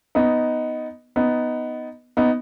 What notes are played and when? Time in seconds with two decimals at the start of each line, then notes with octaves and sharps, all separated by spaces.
0.15 B3 D#4
1.16 B3 D#4
2.17 B3 D#4